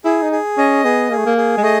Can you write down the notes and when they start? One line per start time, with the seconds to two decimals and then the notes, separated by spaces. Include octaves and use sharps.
0.05 E4 G#4
0.22 D#4
0.32 G#4
0.58 C#4 D#5
0.85 B3 G#4
1.10 A#3 G#4
1.18 A3
1.26 A#3
1.37 G#4
1.58 G#3
1.63 A3 D#5